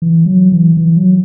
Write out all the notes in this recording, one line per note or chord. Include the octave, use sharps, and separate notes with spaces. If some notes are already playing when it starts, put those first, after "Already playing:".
E3
F#3
E3
E3
F#3